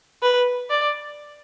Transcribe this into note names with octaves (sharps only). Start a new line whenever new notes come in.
B4
D5